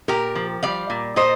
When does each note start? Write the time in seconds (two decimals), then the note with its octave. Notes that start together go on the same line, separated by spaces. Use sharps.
0.08 A#2 G4 A#4
0.35 F3
0.63 G3 D5 F5
0.90 A#2
1.16 A#2 C5 D#5